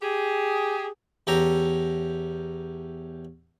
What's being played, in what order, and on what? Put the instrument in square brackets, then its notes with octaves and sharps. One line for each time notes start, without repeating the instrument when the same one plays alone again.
[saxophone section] G4 G#4
[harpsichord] E2 C#4 G4 A4 A#5